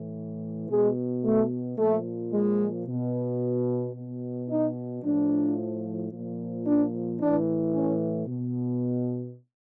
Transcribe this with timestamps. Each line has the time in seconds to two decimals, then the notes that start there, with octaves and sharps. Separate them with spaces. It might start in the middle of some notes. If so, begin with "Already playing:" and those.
Already playing: A2 E3
0.69 B2 G#3
1.24 A3
1.78 A#2 F3 A3
2.32 G#3
2.86 B2
3.94 B2
4.49 D#4
5.03 A2 F3 D4
6.11 A#2 F3
6.65 D4
7.19 A2 E3 D4
7.73 C#4
8.27 B2